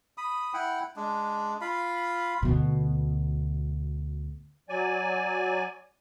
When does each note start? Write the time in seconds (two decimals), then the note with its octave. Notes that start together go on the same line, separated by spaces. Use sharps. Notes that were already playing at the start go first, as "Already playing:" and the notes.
0.18 B5 D#6
0.54 E4 F#5 G5
0.96 G#3 D4
1.61 F4 F5 B5
2.42 D2 B2
4.69 F#3 D5 G#5